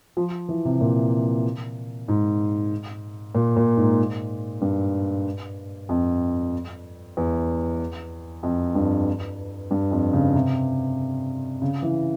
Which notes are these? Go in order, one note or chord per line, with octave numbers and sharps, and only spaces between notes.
F3
E3
C3
A#2
G#2
A#2
A#2
G#2
G2
F2
E2
F2
G2
G2
F2
C#3
C3
C#3
E3